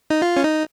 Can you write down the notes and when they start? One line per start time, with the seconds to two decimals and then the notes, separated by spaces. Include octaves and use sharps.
0.10 D#4
0.22 F4
0.37 C#4
0.44 D#4